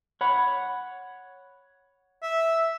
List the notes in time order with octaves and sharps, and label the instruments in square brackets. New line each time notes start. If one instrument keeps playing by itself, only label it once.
[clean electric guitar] C#5 F#5 B5
[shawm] E5